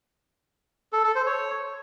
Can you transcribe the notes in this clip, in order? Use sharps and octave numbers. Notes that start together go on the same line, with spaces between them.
A4
A4
C5
C#5